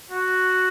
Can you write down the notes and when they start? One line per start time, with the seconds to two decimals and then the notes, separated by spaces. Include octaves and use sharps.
0.11 F#4